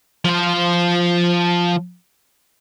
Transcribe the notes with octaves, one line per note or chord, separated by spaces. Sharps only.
F3 C5